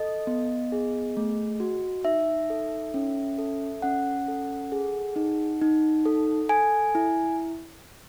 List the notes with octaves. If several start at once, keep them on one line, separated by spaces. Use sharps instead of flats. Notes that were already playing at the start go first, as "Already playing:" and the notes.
Already playing: A4 D#5
B3
G#4
A3
F#4
D#4 E5
A4
C#4
A4
C#4 F#5
A4
G#4
D#4
D#4
A4
A4 G#5
E4